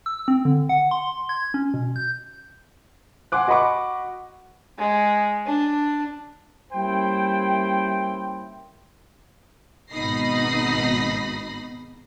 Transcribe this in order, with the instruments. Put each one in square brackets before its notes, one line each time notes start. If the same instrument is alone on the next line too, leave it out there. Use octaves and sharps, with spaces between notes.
[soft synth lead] E6
C4
D3
F#5
C6
G#6
C#4
B2
G6
[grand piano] F#5 G#5 C6 D6 F#6
F#4 D#5 F#5 B5 C#6 D6
[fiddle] G#3
D4
[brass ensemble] G3 A#3 C#4 E4 C5 G5
[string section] G#1 B2 D#4 B5 A#6 C7